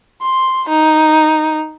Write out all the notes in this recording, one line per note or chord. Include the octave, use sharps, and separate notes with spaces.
C6
D#4